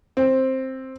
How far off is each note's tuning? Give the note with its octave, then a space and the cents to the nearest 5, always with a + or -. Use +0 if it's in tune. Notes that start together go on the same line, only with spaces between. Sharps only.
C4 +10